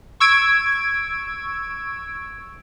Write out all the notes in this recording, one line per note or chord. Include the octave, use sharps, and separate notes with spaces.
C#6 E6 G#6 D7